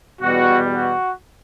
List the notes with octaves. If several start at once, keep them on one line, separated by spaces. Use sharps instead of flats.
E2 B2 G3 F#4
F#4